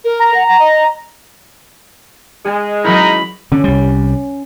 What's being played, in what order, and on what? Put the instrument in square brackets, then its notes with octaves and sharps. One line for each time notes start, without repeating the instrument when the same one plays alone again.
[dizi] A#4
[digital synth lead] A#5
[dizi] F#5
F#5
D#5
[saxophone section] G#3 [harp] G#4
[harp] F#3 C#4 E4 [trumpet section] D#4 A#4 [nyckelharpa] B5
[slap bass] D3 [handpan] C#4
[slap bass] C2 G3